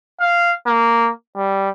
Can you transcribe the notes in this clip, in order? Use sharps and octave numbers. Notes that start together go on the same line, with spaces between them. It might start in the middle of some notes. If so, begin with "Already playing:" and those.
F5
A#3
G3